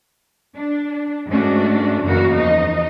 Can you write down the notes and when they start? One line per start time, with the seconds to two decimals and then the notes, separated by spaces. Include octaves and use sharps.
0.56 D4
1.28 G#2 A3 C#4 D4 F#4
2.03 F#2 C#3 E3 A#3 F#4 A#4
2.34 E2 F3 D#4 D#5